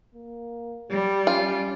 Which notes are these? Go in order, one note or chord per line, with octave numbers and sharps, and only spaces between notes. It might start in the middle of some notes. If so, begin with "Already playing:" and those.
A#3
G3 G4
C#4 F4